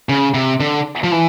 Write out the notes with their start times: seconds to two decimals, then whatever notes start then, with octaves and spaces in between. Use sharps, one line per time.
0.09 C#3
0.34 C3
0.60 D3
1.04 F3
1.12 E3